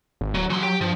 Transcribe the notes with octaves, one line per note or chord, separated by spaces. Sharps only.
G#1
D1 F#3
E3 F#3 C6
G4 G5
G2 F3